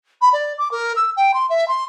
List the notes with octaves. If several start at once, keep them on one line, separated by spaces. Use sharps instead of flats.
B5
D5
D6
A#4
E6
G5
C6
E5
C6